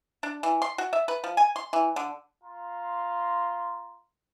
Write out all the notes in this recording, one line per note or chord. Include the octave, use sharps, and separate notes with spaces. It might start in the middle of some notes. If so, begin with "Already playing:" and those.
D4
E3
C6
F#4
E5
B4
F3
G#5
C6
E3
D3
F4 A#5 C6